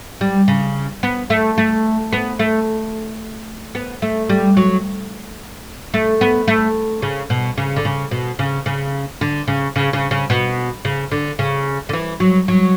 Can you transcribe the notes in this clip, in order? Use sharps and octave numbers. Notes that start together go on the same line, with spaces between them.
G3
C#3
B3
A3
A3
B3
A3
B3
A3
G3
F#3
A3
B3
A3
C#3
B2
C#3
D3
C#3
B2
C#3
C#3
D3
C#3
C#3
C#3
C#3
B2
C#3
D3
C#3
D3
E3
F#3
F#3